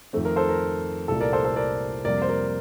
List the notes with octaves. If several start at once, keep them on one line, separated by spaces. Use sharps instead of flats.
F2 D#3 A3 C4
A#4
A4 C5
A#4
C2 A#2 A3 A4
A#4 D5
A4 C5
A4 C5
A#4 D5
F2 C3 G3 A#3 A#4 D5
C5
A#4 D5